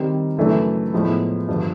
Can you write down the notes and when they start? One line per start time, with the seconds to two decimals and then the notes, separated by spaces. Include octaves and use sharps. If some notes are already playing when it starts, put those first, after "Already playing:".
Already playing: D#3 G3 C4 D#4
0.37 F#2 C#3 E3 A3 D4
0.92 A2 F3 G#3 B3
1.48 G2 D3 F3